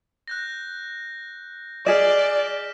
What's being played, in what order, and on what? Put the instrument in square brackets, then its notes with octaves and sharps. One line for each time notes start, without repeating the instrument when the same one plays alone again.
[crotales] F#6 G6 A#6
[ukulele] G#4 D#5 [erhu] D5 [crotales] F6 B6 E7